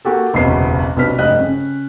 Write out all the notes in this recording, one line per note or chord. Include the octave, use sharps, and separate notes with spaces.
A#3 F#4 G4 A4
F#1 B1 E2 C3 B4 C7
B1 C3 D4 B4 F6 B6
F1 G2 D#5 G5 F#6
C#3 C#4